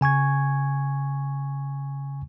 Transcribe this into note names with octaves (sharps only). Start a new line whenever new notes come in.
C#3 G#5 C#6 G#6